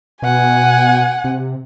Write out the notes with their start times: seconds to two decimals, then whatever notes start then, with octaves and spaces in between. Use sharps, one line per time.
0.23 B2 F#5 G#5
1.24 C3